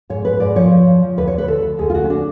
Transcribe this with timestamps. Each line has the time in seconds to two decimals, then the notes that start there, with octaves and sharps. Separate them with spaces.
0.10 G#2 C#5
0.25 G#2 B4
0.40 G#2 D5
0.55 F3 C#5
0.71 F3
0.87 F3
1.02 F3
1.17 D2 B4
1.27 C#5
1.33 D2
1.38 B4
1.48 D2 A4
1.63 D2
1.78 D2 G#4
1.90 F4
1.94 D2 F#4
2.04 C#4
2.10 D4